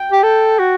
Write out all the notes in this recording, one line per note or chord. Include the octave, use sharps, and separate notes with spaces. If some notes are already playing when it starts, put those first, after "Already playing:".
Already playing: G5
G4
A4
F#4